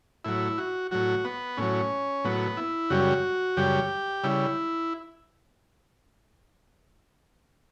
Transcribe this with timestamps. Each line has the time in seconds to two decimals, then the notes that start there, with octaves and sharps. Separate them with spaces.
0.25 A2 F#3 E4
0.58 F#4
0.91 A2 F#3 F#4
1.25 B3
1.57 A2 F#3 C#4
2.24 A2 F#3 B3
2.57 E4
2.90 F#2 C#3 G3 F#4
3.57 F#2 C#3 G3 G4
4.24 C#3 G3 E4